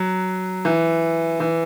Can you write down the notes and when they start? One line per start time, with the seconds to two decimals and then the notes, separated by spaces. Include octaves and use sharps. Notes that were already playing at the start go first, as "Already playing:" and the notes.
Already playing: F#3
0.65 E3
1.40 E3